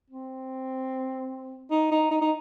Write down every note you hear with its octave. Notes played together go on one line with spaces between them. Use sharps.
C4
D#4
D#4
D#4
D#4